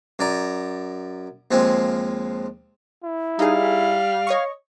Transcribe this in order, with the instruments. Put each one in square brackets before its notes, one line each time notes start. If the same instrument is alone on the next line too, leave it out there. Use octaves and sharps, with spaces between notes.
[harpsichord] F#2 D5 A#5
D#2 F3 G#3 C4
[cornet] E4
[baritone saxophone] G3 [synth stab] D#4 G#4 [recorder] F5
[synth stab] C#5 D#5 C#6